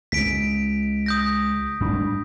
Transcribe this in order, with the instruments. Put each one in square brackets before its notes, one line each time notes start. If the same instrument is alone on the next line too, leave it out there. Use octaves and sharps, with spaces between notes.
[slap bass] C#2 [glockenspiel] B6 D7
[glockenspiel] D#6 G6 A#6
[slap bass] G#2 G3 D4